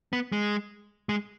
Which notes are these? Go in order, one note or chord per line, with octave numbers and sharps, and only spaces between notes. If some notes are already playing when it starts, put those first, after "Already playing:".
B3
G#3
G#3